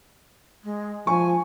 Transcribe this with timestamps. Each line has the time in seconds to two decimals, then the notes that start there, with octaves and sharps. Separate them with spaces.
0.63 G#3
1.07 F3 G#5 C#6